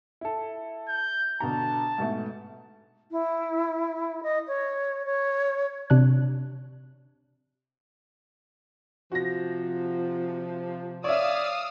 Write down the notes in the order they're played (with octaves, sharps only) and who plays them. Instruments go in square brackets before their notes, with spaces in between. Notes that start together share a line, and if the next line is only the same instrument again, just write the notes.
[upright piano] E4 A4
[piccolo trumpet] G6
[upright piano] B2 D3 A#5 [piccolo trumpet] A5
[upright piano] G#2 B2 A3
[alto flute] E4
D#5
C#5
C#5
[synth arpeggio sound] C3 D4 F#6
[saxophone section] C3 F3 [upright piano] F#4 A#6
[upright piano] C#5 E5 [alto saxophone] D5 [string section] F5 D#6 E6